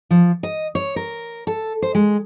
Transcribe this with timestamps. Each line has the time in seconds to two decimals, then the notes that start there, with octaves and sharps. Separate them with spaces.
0.11 F3
0.43 D#5
0.75 C#5
0.96 A#4
1.47 A4
1.82 C5
1.95 G#3